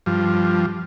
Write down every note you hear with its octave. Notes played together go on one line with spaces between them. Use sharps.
G2 F3